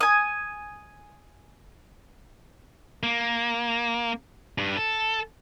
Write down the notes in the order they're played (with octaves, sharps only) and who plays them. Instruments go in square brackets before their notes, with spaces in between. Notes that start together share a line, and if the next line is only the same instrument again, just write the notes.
[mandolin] G#5 D#6
[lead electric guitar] A#3
G2
A4